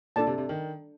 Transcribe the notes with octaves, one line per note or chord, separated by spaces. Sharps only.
A#2 D4 A4 D5 A5
C3
C3
D#3